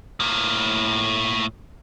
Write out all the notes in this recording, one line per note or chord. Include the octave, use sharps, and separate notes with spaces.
A2 A#3